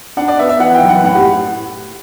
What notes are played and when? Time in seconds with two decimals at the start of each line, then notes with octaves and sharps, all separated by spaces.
0.17 D4 F#5
0.28 D5
0.39 B3 E5
0.49 E5
0.60 E3 F#5
0.74 G5
0.83 F#2
0.89 F#5
1.03 A2 F#5
1.15 G4